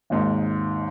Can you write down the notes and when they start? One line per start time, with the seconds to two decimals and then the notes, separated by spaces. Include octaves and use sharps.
0.10 G#1 D#2 G#2